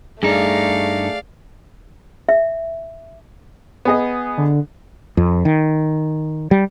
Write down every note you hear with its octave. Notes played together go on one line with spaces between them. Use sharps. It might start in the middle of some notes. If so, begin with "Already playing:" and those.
G2 A3 D#4 G#4 D5 F5
E5
B3 G#4 D#5
D3
F2
D#3
G3